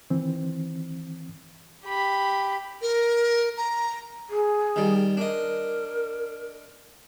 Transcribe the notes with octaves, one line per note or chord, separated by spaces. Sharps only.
D#3 E3 C4
G4 B5
A#4
A#5
G#4
D#3 G3
D4 A#4 D#5